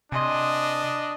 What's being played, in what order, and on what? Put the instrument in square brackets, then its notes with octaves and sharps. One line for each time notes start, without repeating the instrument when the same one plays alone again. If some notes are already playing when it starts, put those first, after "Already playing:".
[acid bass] C3 [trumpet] D4 [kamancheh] D#5 [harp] G#5 C6